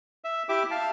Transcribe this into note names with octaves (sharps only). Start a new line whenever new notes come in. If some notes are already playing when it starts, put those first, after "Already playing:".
E5
E4 G4 E5 D6
F5 A5